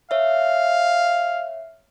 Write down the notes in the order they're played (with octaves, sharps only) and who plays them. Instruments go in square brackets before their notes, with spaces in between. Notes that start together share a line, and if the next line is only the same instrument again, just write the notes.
[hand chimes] C#5 E5 [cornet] F5